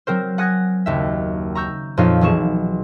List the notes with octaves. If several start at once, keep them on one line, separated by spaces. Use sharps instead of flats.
F#3 C4 A#4 C5
F#5 G#5 D#6 F#6 G#6 A#6
F#1 D#2 E5
A#5 C#6 E6 G6
F2 A#2 F3 D#4 C#5 F5
B1 E3 G#4 C#6 E7